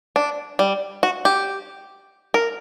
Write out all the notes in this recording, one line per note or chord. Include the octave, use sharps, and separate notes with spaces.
D4
G3
F#4
G4
A#4